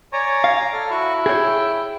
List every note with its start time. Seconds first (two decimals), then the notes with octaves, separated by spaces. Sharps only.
0.13 C#5 D5 G#5 A#5
0.44 F5
0.73 A4 F6
0.91 E4 F#4 C#6
1.26 G#4 C#5 G5